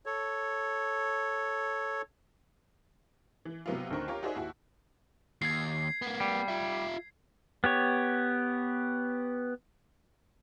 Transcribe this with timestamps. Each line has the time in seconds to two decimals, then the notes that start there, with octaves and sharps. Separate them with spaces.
0.06 A4 C#5
3.45 E3
3.66 C3 F#3 B3 E4 F4
3.90 D2 D3 D#3 C4 A#4 C#6
4.08 F4 G4 A#4 C#5
4.23 D#4 F#4 G#4 C5 D5 E5
4.36 D#2 E4 F#4
5.42 D#2 G#6 C7
6.02 A#3 B3
6.20 G3
6.48 F4 E5
7.64 B3 G4 C#5